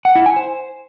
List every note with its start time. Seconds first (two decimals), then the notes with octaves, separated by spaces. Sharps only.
0.05 F#5
0.15 E4
0.26 G#5
0.36 C5